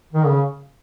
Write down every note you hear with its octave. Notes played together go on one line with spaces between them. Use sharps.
D#3
C#3